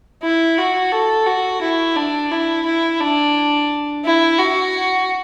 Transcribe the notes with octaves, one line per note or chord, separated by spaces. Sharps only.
E4
F#4
A4
F#4
E4
D4
E4
E4
D4
E4
F#4